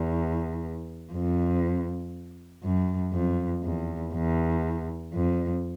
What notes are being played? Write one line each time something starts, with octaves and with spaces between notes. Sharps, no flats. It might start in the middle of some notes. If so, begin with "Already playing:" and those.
Already playing: E2
F2
F#2
F2
E2
E2
F2